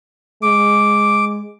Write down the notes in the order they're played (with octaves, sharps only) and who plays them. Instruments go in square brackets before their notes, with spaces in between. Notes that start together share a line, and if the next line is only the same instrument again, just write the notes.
[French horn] G#3 [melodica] D6